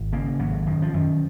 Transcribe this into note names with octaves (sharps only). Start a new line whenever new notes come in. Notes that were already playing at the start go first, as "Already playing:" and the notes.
Already playing: G#1
C#3 A#3
G#1 F#3
F#2 D#3
F3
F#2 D#3